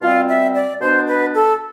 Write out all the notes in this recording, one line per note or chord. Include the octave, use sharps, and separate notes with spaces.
B2 G3 C4 F4
E5
D5
B2 B3 D4 C5
B4
A4